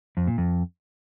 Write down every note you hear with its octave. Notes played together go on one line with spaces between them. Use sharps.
F2
A#2
F2